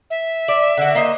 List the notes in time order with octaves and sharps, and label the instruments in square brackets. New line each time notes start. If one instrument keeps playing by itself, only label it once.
[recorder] E5
[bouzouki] D5
D3 F#4
A#3 C5 D#5